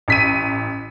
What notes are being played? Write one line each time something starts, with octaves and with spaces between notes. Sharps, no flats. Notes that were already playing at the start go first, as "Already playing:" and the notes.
A1 B6 D#7